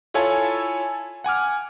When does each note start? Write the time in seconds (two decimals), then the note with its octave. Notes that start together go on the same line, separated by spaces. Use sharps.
0.14 E4 F4 A4 C#5 G#5 A5
1.24 F#5 G#5 D6 F6